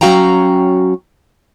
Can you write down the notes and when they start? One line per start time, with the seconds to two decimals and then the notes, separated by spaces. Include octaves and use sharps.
0.01 F#3 C#4 F#4 F5 G5 A#5